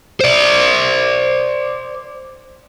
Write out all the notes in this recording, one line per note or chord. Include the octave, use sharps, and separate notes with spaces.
C5 D5